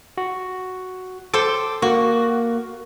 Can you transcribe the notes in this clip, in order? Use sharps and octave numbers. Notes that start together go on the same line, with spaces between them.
F#4
A4 C5 G5 D6
A#3 F#4